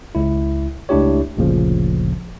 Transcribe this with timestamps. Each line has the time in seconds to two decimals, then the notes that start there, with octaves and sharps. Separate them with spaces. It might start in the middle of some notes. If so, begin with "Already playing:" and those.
0.15 C#2 E4
0.89 C#2 A3 D4 E4 G4 C#5
1.37 G1 D2 A#2 C#3 F3